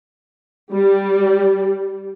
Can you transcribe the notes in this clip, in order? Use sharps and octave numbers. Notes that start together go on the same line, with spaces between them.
G3